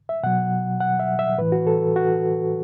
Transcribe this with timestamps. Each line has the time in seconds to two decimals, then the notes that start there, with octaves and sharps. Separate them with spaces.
0.09 E5
0.23 B2 F#3 F#5
0.81 F#5
0.99 E5
1.19 E5
1.38 A2 E3 B4
1.52 F#4
1.67 A4
1.96 F#4